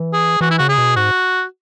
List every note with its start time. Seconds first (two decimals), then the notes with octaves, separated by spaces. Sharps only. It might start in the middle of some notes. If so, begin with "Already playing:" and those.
Already playing: E3
0.13 G#4
0.41 E3 F#4
0.51 E4
0.58 C#3 F#4
0.69 G#4
0.78 B2
0.96 G#2 F#4